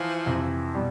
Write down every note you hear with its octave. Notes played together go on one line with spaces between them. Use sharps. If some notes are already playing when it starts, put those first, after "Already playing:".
Already playing: E3 F3
F2 C3 E3
B2 G3